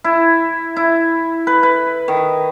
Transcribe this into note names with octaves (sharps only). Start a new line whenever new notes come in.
E4
E4
B4
B4
D#3